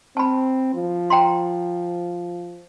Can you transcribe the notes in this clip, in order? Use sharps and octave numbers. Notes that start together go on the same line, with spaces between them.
C4 A5 B5
F3
G5 A#5 C6